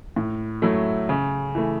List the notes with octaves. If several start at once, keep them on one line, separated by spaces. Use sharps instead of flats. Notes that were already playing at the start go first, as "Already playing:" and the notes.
A2
F#3 A3 E4
C#3
E3 A3